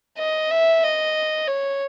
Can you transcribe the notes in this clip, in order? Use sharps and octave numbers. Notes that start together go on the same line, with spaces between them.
D#5
E5
D#5
C#5